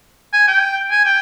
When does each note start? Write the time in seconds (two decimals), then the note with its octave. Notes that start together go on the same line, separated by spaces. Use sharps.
0.33 G#5
0.48 G5
0.91 G#5
1.05 G5